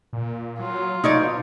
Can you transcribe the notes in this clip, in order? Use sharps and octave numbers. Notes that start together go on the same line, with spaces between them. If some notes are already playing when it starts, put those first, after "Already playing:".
A#2
F#3 F4
B2 D#4 C#5 D5